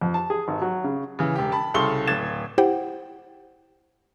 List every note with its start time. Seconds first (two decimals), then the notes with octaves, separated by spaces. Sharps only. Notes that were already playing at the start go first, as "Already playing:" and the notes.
0.01 F2
0.14 A5
0.30 G#4
0.48 G#1
0.62 F#3
0.84 C#3
1.19 C#3 E3
1.36 E1 G4
1.52 A5 B5
1.74 C2 C#3 A4 C6 C#6 G7
2.07 D1 G#6 A6 E7
2.58 E4 G4 C5 F#5 G5